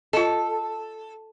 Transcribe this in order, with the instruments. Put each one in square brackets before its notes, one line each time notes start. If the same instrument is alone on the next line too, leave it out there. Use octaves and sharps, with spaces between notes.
[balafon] F4 D#5 [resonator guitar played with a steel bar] A4